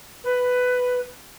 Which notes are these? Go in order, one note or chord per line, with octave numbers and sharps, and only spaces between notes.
B4